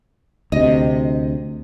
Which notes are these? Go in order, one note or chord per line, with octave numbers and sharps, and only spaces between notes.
D2 C3 D#5